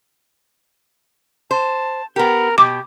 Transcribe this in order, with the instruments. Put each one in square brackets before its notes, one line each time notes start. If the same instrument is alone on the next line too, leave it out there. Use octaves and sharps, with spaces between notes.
[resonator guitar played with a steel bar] C5 [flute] A5
[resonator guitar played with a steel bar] B3 G4 [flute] A#4
[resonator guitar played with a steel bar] B2 [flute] G4 [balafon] D6